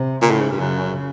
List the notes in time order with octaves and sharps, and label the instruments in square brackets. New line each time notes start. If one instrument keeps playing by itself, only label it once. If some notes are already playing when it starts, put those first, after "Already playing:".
Already playing: [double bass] C3
[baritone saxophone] A#2 [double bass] C#3
[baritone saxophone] A2
G#2
G2
[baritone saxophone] F#2 [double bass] C#3